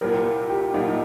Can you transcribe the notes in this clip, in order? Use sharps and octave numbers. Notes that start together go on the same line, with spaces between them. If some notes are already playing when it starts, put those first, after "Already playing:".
C2 A#2 G3 A#4
G4
C2 A#2 G3 D#4